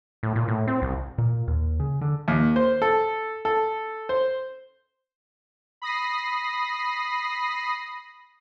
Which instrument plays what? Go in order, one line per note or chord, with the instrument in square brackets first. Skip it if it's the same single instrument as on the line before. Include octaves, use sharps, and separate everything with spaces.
[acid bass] A2
A#2
A2
C4
C2
[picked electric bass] A#2
D#2
C#3
D3
[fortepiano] D#2
C5
A4
A4
C5
[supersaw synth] B5 D#6 A#6 C7